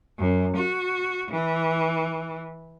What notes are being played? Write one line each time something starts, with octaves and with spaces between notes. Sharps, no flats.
F#2
F#4
E3